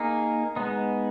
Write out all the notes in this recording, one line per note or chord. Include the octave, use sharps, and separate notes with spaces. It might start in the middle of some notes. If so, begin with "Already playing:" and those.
Already playing: A#3 D#4 G#4
G#3 B3 D#4